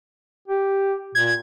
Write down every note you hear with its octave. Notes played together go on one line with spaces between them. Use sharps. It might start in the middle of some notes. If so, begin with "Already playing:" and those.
G4
A#2 G#6